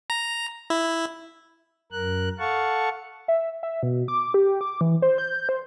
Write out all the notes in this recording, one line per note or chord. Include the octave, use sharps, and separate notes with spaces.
A#5
E4
F#2 A#4 F#6
A4 F5 F#5 A5 C#6
E5
E5
B2
D6
G4
D6
E3
C5
G6
C5